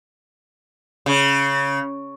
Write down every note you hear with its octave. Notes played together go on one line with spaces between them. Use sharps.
C#3